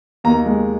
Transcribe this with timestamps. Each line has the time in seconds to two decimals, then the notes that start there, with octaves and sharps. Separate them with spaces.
0.24 D#2 A#5
0.46 G#3